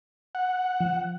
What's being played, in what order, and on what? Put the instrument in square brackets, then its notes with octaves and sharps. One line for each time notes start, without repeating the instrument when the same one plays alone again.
[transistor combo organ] F#5
[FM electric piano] F3